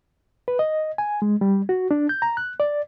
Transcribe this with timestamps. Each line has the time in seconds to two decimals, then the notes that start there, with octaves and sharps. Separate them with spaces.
0.48 B4
0.59 D#5
0.98 G#5
1.22 G#3
1.41 G3
1.69 F#4
1.91 D4
2.09 G6
2.22 A#5
2.37 F#6
2.60 D5